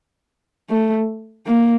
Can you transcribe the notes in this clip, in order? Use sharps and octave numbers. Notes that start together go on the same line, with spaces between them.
A3
A#3